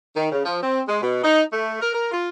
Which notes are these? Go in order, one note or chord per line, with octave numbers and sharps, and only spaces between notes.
D#3
C#3
F3
C4
G#3
B2
D#4
A3
A#4
A#4
F4